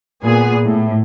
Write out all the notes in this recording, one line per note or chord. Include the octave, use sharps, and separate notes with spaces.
A#2 B3 G#4
A2